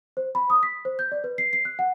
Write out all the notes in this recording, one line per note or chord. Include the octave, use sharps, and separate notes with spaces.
C5
B5
D#6
B6
C5
G6
D5
B4
C7
C7
F#6
F#5